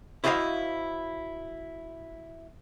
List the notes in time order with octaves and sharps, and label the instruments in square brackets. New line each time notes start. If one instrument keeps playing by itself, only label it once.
[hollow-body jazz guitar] E4 F#4 C5 D5 D#5 F5